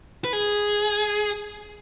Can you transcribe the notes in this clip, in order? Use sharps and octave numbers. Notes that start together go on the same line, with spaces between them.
B4
G#4